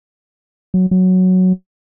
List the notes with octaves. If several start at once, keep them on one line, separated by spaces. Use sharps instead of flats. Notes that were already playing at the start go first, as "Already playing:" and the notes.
F#3
F#3